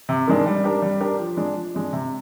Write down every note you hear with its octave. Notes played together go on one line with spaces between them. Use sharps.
C3
D#3 G#3 D4
G3
D4 G4 A#4
G3
D4 G4 A#4
F3
G#3 D4
F3
G#3 D4
C3